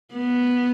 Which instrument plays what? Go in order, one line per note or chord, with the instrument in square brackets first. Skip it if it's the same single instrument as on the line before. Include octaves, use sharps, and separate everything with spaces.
[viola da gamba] B3